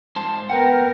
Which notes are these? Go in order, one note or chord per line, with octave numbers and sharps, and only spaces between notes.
G#2 C5 A5
B3 A#4 B4 F#5 G5